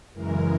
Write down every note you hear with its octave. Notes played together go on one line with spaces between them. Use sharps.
F#2 C#3 E3 G#3 A#4